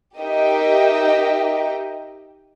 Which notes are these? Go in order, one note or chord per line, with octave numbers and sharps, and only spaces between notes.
D#4 G4 A#4 D#5 E5 G5